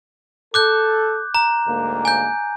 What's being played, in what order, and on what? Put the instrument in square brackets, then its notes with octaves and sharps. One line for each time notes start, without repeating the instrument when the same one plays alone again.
[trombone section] A4 [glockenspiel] D6 F#6 G6
[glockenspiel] A#5
[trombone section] D2 G#2 A#3
[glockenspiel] G#5 G6